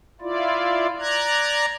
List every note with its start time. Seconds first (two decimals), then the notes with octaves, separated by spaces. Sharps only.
0.21 E4 F4 D5
0.99 D5 A#5 F#6 G#6